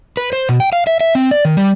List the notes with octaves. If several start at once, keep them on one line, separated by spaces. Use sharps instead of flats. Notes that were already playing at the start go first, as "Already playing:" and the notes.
B4
C5
B2
G5
F5
E5
E5
C4
D5
D#3
G3